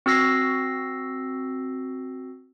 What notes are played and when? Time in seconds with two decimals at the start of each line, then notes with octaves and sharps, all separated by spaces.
0.06 C4 F#4 E6 A#6 C7